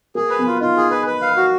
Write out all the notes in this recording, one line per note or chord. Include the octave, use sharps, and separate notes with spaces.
A#3 G#4
B4
B3
F4
D#4 F4
G#4
B4
B4
F5
F#4